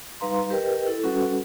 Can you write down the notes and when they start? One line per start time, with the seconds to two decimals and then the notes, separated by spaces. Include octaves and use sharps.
0.20 G3 D#4 B4 F5 A#5 C6
0.50 G4 A#4 B4 D#5 G5
0.88 E4 A4
1.03 G3 C#4 F#4 A4 B4 F#5